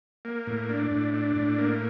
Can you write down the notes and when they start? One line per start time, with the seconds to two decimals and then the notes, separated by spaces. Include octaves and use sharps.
0.25 A#3
0.47 A2
0.69 D4
0.91 A2
1.14 D4
1.36 A2
1.58 A#3